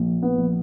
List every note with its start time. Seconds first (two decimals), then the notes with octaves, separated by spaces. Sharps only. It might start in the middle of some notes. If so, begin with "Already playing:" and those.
Already playing: A#1
0.22 B3
0.37 A#1